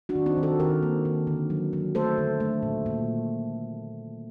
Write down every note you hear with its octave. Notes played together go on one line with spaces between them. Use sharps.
D4 F#4
D#3
C4 D#4
D#3
F#4 A4
D#3 G4 A#4
A#3
D#3
D3
F#3
F#3
A3 A4 C5
D3
A3
A#2
A#2